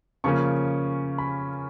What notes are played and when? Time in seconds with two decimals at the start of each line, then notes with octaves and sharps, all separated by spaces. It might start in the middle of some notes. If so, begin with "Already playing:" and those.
0.24 C#3 F3 A#3 C#4 C#6
1.18 B5